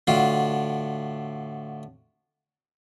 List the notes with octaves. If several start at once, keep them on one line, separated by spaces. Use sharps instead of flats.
A2 D3 F4 F#4